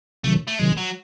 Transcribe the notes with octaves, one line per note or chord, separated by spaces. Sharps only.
C3 D#3 F#3 A3
A3
C3 D#3 F#3 G#3
F#3